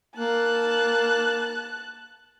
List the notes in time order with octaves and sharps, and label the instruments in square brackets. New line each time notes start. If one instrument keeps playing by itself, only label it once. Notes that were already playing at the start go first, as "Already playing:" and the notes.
[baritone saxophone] A#3 [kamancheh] A5 F#6